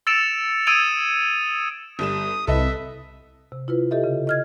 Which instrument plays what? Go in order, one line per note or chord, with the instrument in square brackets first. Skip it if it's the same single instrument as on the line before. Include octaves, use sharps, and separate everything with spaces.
[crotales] E6 A6 C#7 D7 E7 F7
D#6 E6 G#6 D7 D#7 F7
[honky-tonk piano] G1 G3 E7 [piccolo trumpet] D#6
[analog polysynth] C2 [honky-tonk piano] A4 B4 D#5 [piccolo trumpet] E5
[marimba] C3
E4 F4 B4
G4 A4 D#5 E5
C#3
D#5 F6 G#6